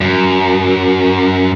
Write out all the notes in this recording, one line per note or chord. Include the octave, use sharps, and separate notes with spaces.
F#2